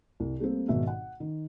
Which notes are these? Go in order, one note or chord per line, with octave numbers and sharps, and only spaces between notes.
C2
G3 A3 A#3 C4
G#1 B2 D#3 F#4 E5
F#5
D#3